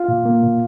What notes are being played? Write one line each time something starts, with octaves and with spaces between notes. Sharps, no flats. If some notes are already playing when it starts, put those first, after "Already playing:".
Already playing: F4 F5
A#2
A#3
A#2